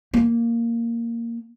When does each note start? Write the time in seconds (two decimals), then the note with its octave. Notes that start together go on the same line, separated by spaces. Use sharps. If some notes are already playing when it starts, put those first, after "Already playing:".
0.14 A#3